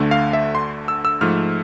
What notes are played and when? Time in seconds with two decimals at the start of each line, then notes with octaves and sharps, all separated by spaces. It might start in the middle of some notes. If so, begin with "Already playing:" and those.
Already playing: D2 D3 A3
0.11 F5
0.33 E5
0.55 C6
0.88 E6
1.05 E6
1.21 G#2 F3 A3 F6